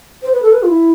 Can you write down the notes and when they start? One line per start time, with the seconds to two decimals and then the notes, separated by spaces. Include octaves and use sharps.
0.23 C5
0.33 B4
0.42 A4
0.52 B4
0.62 F4
0.68 E4